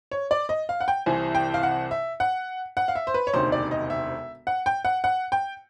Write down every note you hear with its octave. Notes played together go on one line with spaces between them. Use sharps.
C#5
D5
D#5
F5
F#5
G5
C2 C3 E3 G#5
G5
F5
F#5
E5
F#5
F#5
F5
E5
C5
B4
C#5
E1 D2 C3 D#3 C5
D5
D#5
E5
F#5
G5
F#5
F#5
G5